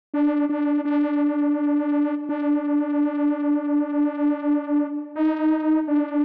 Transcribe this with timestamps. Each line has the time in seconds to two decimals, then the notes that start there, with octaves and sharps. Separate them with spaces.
0.14 D4
0.49 D4
0.85 D4
2.29 D4
5.15 D#4
5.88 D4